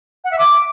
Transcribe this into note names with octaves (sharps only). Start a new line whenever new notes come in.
F#5
E5
D6